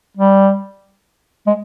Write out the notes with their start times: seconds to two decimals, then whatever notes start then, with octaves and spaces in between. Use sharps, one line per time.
0.17 G3
1.47 G#3